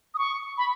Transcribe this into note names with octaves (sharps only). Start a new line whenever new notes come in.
D#6
C#6
B5